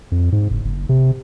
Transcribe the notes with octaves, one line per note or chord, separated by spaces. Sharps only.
F2
G#2
F#1
F#1
C3